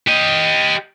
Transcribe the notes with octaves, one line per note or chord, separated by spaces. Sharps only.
G4 D#5